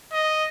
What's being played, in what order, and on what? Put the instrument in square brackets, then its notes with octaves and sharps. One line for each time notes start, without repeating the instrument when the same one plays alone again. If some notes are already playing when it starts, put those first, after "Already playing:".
[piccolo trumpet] D#5